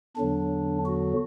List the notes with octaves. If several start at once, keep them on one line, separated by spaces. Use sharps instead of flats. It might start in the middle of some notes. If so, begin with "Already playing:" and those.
E2 D3 F#3 D4
F#4